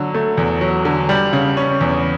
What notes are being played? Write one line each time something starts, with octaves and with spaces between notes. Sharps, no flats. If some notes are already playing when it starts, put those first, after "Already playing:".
Already playing: D3 F#3
A3
E2
F#3
D3
G3
C#3
C#4
E2